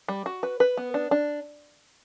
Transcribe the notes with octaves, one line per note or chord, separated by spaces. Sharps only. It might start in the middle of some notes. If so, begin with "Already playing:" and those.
G3
F#4
B4
B4
B3
D4
D4